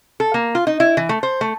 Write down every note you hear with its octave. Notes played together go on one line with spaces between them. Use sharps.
A4
A#3
F4
D#4
E4
E3
A3
C5
A3